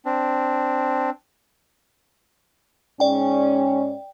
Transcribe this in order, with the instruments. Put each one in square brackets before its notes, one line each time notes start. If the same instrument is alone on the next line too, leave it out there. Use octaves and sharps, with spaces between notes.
[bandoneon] C4 D4
[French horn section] G#2 C#4 [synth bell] D5 G5